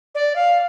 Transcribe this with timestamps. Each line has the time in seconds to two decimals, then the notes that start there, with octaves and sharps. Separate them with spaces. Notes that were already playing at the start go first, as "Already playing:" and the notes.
0.15 D5
0.36 F5